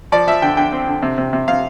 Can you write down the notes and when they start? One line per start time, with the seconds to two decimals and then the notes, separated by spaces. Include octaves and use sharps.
0.12 F3 D5
0.27 F3 E5
0.42 D3 G5
0.57 D3 G5
0.72 C4
0.87 D3
1.02 C3
1.18 C3
1.33 C3
1.48 C3 F5